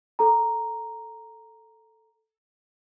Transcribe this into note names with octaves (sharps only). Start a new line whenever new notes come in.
A4 A#5